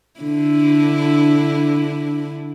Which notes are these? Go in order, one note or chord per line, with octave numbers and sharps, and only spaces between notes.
D3 D4 E4